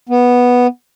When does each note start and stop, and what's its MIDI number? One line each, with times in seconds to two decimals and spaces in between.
0.09 0.67 59